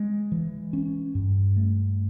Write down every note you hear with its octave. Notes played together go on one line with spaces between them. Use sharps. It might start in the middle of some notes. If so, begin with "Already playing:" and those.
Already playing: G#3
E3
C#4
G2
A3